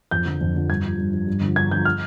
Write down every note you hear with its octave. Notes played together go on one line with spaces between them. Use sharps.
F2 G6
D3 F3
F2
D3 F3
G2 G#6
F3
G2
F3
G2
D3 F3
G2 G#6
D3 F3 G6
F6